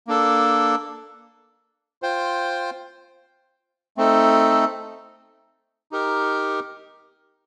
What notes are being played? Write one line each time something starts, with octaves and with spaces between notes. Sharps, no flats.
A#3 D4 A4
F4 C5 G5
A3 C4 D#4 A4
D#4 G4 A#4